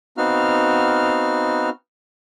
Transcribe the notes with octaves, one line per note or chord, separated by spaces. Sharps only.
B3 C4 D#4 F#4 F5 F6